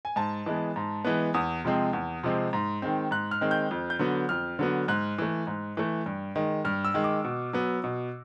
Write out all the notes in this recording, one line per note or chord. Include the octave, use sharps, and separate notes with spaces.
G#5
G#2 A5
E3 G#3 B3
G#2
E3 G#3 B3
E2 D#6
C3 F3 G#3 C4
E2
C3 F3 G#3 C4
G#2
D#3 G#3 C4
G#2 F#6
F6
D#3 G#3 C4
G6
F2
G6
D3 F#3 B3
F2 F6
D3 F#3 B3
G#2 F#6
E3 A3
G#2
E3 A3
G2
D#3 G#3
G2 F6
E6
D#3 G#3
D6
B2
F#3 B3
B2